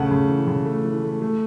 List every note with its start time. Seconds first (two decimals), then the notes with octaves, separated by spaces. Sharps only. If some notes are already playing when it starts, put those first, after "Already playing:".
Already playing: C#3 A3 F#5 A5
0.11 C#3
0.30 E3
0.48 C#3
0.65 A3
0.84 E3
1.03 A3
1.21 A3